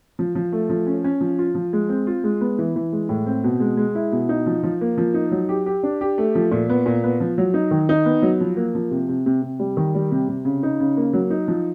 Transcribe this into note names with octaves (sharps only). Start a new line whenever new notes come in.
F3
F3
A3
F3
C#4
C#4
F3
F4
F3
G#3
C4
F4
G#3
B3
E3
E3
G#3
A2
C4
B2
G#3
G#3
E4
B2
D#4
F3
F3
A#3
F3
D#4
F#3
G4
G4
D4
G4
A3
F3
A#2
B3
A#2
B3
F3
F#3
D#4
D#3
D#4
B3
F#3
F3
A#3
F3
C3
C3
C3
C3
G3
D#3
G3
C3
C3
C#3
D#4
C#3
A#3
F#3
D#4
F3